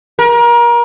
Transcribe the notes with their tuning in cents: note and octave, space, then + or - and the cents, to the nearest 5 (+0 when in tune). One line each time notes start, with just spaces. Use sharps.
A#4 +30